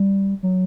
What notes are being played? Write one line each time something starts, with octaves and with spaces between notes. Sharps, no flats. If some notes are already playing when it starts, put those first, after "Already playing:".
Already playing: G3
F#3